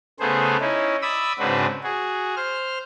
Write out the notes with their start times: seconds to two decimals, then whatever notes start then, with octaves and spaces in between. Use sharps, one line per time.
0.20 C#3 A3 B3 G#4 C5
0.61 C#4 D#4 E4
1.02 D5 E5 B5 D#6 E6
1.39 G#2 C#3 C4 D4 F#4 B4
1.84 F#4 G#4
2.36 C5 F6